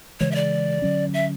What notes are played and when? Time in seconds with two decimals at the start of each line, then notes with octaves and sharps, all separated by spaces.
0.20 C#3 E3 G#3 C#5
0.31 E5
0.35 D5
0.82 D3 F#3 C#4
1.14 E5